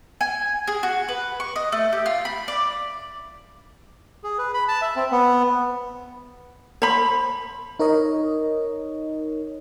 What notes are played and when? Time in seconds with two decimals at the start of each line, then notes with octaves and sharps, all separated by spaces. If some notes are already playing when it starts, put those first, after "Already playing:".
0.21 G#5
0.67 G#4
0.83 F#4
1.09 B4
1.40 C#6
1.56 D#5
1.72 A3
1.93 G4
2.06 F4
2.25 B5
2.48 D5
4.24 G#4
4.38 B4
4.54 B5
4.68 A5
4.82 E5
4.96 C4
5.11 B3
6.82 C5 B5
7.80 D#4 A#4 C#5 D#5